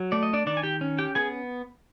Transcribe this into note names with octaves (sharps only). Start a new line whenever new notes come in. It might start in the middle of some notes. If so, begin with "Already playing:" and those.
Already playing: F#3
A3 D5
D#5
D4 D5
D#3 D4 D5
G#5
G4 G5
C#4
G4 G5
B3 G#4 G#5